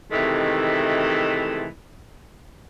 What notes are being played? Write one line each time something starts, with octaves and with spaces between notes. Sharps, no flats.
C3 D#3 E3 G#3 A3